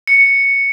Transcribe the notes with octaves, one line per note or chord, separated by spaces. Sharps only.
C#7